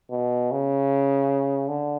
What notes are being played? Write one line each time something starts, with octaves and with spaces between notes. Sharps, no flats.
B2
C#3
D3